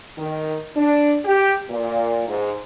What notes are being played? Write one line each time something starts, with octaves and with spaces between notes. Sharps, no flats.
D#3
D4
G4
A#2
G#2